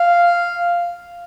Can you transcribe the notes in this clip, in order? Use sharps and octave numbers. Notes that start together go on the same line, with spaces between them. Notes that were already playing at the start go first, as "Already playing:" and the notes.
Already playing: F5